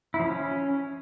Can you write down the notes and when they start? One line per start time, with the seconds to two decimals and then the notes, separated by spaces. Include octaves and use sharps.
0.14 E4
0.19 F3
0.25 C#4